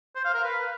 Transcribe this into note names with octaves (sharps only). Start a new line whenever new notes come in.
C5
F5
A#4
B4